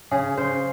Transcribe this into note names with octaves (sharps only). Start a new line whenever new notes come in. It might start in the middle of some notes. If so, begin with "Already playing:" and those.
C#3 G#4
C#3 C5